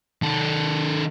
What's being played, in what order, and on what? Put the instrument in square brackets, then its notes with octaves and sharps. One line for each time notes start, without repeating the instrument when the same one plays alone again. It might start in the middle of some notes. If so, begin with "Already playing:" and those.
[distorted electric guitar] D#3 A4